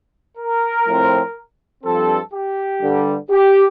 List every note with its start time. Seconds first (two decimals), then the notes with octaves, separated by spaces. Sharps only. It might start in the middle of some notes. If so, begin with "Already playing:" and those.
0.38 A#4
0.87 A2 F3 C4
1.84 G2 F3 C4 A4
2.33 G4
2.81 G2 D3 G3
3.30 G4